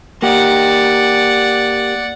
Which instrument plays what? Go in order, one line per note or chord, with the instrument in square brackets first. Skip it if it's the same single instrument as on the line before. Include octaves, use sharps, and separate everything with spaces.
[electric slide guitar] A#3 G4 [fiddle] D5 F#5